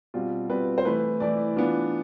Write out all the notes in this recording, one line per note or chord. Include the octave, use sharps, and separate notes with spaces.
B2 G3 C4 F4
B2 G3 C4 F4 B4
C5
E3 A3 E4 B4
E3 A3 E4 D5
E3 B3 D4 F4